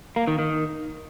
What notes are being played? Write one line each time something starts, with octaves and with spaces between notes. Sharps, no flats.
A#3
D#3
D#3